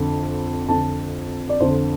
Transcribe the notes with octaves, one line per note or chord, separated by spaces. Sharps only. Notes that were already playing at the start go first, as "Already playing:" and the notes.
Already playing: F2 D3
F2 D3 A5
D5
F2 D3 C5